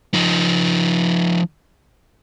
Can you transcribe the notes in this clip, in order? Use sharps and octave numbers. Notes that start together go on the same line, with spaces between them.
F3 D#4